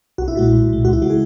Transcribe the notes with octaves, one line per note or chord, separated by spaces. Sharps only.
B1 F#4
E4
A#2 G#3 F#4
B1
A#2 G#3
C#2 F#4
E4
C#3 G#3 F#4
G#4